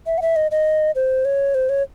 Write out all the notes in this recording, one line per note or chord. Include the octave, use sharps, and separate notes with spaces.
E5
F#5
E5
D#5
D#5
C5
C#5
C5
C#5